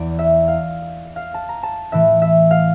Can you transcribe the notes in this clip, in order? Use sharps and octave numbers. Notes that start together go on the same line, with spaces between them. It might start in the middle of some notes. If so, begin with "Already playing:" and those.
Already playing: E2 E3 D5
E5
F5
F5
A5
A#5
A5
A2 E3 E5
E5
F5